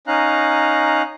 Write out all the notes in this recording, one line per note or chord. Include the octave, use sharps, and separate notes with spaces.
C#4 D#4 F5 A#5 F#6